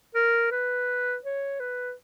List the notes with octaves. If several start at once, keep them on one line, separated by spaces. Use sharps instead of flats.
A#4
B4
C#5
B4